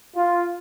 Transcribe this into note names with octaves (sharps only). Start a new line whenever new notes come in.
F4